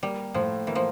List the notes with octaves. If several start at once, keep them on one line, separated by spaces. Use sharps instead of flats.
G3 A#3
A2 F3
E3 A#3
F3